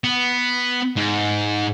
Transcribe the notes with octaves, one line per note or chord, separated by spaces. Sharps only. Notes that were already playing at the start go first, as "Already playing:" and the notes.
B3
G#2